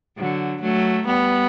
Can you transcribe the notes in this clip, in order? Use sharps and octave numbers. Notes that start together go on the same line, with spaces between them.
D3 F#3
F#3 A3
G3 B3